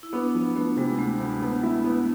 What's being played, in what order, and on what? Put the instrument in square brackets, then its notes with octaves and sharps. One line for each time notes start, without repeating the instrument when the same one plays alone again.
[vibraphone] E4
[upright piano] B3 [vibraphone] D4
[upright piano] F3
[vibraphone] A3 [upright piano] B3
[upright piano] C3 [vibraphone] G#3
[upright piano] D2 [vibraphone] A3
[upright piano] D2
B3
E4
B3